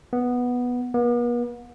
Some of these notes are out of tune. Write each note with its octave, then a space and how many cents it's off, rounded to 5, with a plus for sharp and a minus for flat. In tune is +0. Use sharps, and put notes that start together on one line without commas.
B3 -5
B3 -45